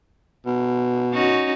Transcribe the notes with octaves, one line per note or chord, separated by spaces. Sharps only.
B2
C#4 D#4 F#4